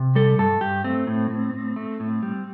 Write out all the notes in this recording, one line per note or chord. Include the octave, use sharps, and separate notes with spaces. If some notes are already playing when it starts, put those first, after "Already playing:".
Already playing: C3
G3 A4
G2 A4
G2 G4
A3 C4
A2
A2
A2
A3
A2
G3